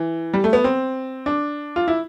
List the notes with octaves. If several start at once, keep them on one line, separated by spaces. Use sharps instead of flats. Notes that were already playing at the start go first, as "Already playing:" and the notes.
Already playing: E3
G3
A3
B3
C4
D4
F4
E4